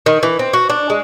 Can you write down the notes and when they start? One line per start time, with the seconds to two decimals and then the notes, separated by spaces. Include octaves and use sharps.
0.06 D#3
0.23 E3
0.39 C4
0.53 F#4
0.69 D4
0.90 G#3